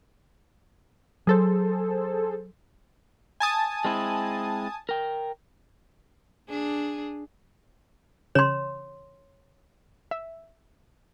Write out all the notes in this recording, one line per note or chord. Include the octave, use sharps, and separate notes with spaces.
F#3 G#4 A4 C5
G#5 A5 D#6
G#3 C4 E4
A#4 G5
D4 G#4
C#3 C#5 C6 E7
E5